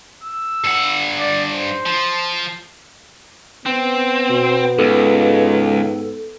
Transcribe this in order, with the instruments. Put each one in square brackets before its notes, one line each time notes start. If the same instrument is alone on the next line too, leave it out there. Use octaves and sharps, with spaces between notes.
[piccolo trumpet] E6
[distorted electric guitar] G2 F#5
[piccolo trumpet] D5
C5
[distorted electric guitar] F3
[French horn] B3 [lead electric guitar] C4
[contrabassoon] B2
[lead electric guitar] C#2 [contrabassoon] G#2 [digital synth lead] A4